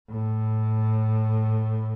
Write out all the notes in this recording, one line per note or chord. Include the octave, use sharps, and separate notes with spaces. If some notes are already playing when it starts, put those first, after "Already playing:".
A2